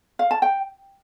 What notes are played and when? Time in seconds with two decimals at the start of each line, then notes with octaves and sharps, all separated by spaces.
0.19 F5
0.31 A5
0.42 G5